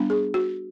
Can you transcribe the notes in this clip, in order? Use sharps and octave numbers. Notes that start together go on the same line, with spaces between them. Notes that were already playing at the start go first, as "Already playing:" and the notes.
Already playing: G3 B3 D4
G#4
F#4